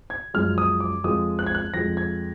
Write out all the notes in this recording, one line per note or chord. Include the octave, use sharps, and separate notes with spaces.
G#6
F#2 F3 G#3 F6
D#6
D6
F2 F3 G#3 D#6
F#6
G#6
F#6
F2 F3 G#3 A#6
G#6